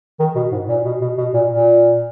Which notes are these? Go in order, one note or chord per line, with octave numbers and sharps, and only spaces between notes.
D#3
B2
G#2
A#2
B2
B2
B2
A#2
A#2